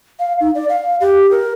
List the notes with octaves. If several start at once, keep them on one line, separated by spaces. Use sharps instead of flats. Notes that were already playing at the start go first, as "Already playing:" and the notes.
F5
D#4
D5
F5
G4
A#4